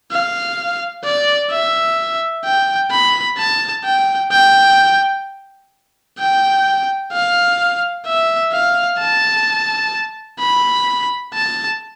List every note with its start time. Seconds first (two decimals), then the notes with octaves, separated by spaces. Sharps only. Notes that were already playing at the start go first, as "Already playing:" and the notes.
0.11 F5
1.04 D5
1.51 E5
2.44 G5
2.91 B5
3.38 A5
3.84 G5
4.31 G5
6.19 G5
7.12 F5
8.06 E5
8.52 F5
8.99 A5
10.39 B5
11.34 A5